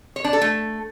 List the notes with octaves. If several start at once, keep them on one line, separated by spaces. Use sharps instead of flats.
C#5
D4
A4
A3